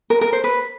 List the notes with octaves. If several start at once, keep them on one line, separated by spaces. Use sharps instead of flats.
A#4
A#4
C5
B4